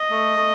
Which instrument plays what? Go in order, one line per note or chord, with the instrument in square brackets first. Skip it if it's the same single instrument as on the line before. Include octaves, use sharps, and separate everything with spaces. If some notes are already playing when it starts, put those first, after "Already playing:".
Already playing: [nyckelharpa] D#5
[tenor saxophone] A3
A3